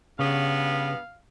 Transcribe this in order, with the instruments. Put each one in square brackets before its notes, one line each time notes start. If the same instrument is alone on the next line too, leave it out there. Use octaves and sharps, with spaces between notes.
[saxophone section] G2 B3 [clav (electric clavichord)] C#3 [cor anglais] F5